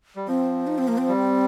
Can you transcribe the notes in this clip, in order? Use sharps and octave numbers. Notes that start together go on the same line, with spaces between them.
G3
F3 C4
D#4
C4
A#3
C4
G3